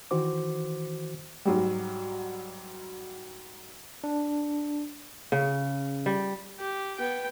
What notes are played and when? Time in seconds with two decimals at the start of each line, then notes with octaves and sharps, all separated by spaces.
0.11 D#3 E3 F#4 C5 D6
1.45 G#2 F#3 G3
4.04 D4
5.32 C#3
6.06 G3
6.59 G4
6.98 B3 G5